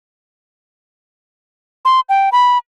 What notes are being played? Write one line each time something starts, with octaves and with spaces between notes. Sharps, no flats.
C6
G5
B5